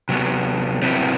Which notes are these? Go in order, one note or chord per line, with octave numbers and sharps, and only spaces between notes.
C3 F#3 B3
C3 F#3 B3 C4 E4